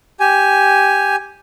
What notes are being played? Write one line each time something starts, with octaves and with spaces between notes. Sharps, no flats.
G4 G#5